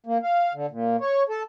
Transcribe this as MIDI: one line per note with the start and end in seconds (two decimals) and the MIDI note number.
0.06 0.18 58
0.23 0.53 77
0.54 0.66 50
0.71 0.96 46
1.01 1.23 73
1.29 1.43 69